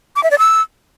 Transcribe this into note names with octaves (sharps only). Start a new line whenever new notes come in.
D6
E5
D5
E6